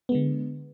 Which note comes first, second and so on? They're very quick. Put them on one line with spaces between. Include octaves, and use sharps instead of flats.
B3 G#3 D3